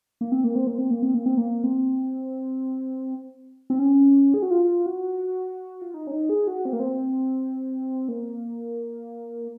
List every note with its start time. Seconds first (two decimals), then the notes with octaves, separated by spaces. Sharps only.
0.21 A#3
0.32 C4
0.44 A#3
0.55 C4
0.67 A#3
0.78 C4
0.91 A#3
1.02 C4
1.14 A#3
1.26 C4
1.37 A#3
1.64 C4
3.70 C4
3.79 C#4
4.34 G#4
4.42 F#4
4.51 F4
4.86 F#4
5.82 F4
5.94 D#4
6.07 C#4
6.12 D#4
6.29 G#4
6.48 F#4
6.65 C4
6.73 A#3
6.80 C4
8.09 A#3